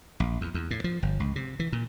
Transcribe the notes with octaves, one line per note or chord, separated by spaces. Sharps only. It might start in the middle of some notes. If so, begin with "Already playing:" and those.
A#1
E2
E2
A2
F3
G1
C#2
C3
E3
A#2